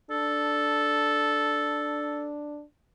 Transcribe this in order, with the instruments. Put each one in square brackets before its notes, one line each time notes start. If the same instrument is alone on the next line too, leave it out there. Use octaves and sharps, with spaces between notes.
[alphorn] D4 [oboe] A4